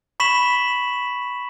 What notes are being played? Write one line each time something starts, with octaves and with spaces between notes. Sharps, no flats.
B5 C#6 B6 E7 F#7